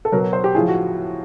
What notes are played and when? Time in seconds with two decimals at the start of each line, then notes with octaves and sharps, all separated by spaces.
0.05 A4
0.12 B2 F#3 A#4
0.23 A#4
0.33 C5
0.44 G4
0.55 A2 F3 G#4
0.68 F#4